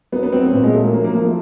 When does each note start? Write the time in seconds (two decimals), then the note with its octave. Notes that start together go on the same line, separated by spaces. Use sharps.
0.12 F#3 B3
0.23 B3
0.32 F#3 C4
0.43 B3
0.53 A#2 C4
0.63 G#3
0.74 F#3 A3
0.84 A#3
0.94 F3 A#3
1.04 A#3
1.15 F3 A#3
1.25 A3